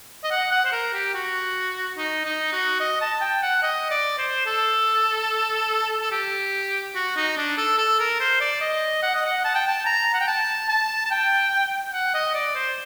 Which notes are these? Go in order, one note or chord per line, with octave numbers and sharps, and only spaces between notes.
D#5
F#5
F#5
C5
A#4
G4
F#4
D#4
D#4
F#4
D#5
A5
G5
F#5
D#5
D5
C5
A4
A4
G4
F#4
D#4
D4
A4
A4
A#4
C5
D5
D#5
F#5
D#5
F#5
A5
G5
A5
A#5
F#5
G5
A5
A5
A5
G5
F#5
D#5
D5
C5